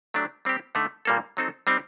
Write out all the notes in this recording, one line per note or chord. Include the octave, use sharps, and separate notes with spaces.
F#3 A3 D4 G4
G3 C4 G4
D3 A3 D#4
A#2 G3 A#3 F#4 A4
F#3 C4 D#4 A4
G3 C4 D#4 G4